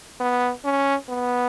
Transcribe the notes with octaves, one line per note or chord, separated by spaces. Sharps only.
B3
C#4
B3